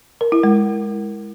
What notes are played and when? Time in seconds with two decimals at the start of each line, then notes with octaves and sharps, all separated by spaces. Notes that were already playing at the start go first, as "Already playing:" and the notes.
0.21 A#4
0.32 E4
0.43 G#3